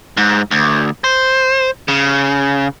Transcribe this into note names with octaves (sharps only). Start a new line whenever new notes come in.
G#2
D2
C5
C#3